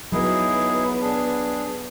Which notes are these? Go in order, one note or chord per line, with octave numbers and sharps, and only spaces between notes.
F#3 B3 D#4 E4 G#4
D4 G#4